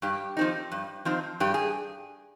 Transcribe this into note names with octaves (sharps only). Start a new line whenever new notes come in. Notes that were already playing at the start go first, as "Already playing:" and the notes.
G2 G4
F3 C4 D#4
G2
F3 C4 D#4
G2 G4
G#4